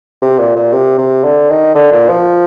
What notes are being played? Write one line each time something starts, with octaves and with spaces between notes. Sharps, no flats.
C3
A#2
A#2
C3
C3
D3
D#3
D3
A#2
F3